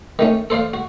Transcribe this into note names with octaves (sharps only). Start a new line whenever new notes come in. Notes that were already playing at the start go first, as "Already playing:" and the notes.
D#3 A3 C#4
A4 C5 D5 F5
F#4